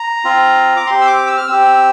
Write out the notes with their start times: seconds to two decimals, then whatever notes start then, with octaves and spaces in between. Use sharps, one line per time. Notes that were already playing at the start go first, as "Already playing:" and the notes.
Already playing: A#5
0.25 C4 F4
0.77 D6
0.86 C4 G4 C6
1.01 E6
1.07 D6
1.27 E6
1.37 F6
1.48 C4 G4 E6